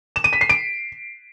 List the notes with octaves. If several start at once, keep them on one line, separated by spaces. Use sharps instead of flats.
E7
D#7
B6
C7
D7